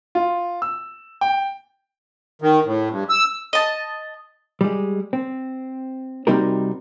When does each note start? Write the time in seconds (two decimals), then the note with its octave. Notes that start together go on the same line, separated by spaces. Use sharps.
0.15 F4
0.62 E6
1.21 G5
2.42 D#3
2.64 A2
2.90 G2
3.09 E6
3.53 D#5 A5
4.61 G3 G#3
5.13 C4
6.27 C3 G3 C4 D#4 F#4 A#4